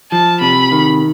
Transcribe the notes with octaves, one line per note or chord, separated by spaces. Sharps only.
F3 A5
C3 B5
D#3